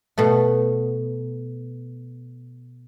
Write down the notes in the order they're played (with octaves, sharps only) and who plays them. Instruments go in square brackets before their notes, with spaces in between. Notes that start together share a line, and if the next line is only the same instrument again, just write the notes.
[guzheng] B2 A3